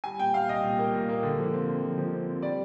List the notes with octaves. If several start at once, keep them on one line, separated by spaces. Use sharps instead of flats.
G3 G#5
A#2 G5
A#2 F5
C2 D#5
A#2
A#3
A#2
A#3
D3
F3
C4
D3
F3
F3
C4
C4
G3 D5